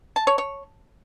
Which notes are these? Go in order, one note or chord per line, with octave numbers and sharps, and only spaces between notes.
A5
C#5
C#5